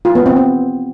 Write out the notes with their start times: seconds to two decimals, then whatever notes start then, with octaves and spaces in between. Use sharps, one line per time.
0.05 F4
0.15 B3
0.26 C4
0.36 C4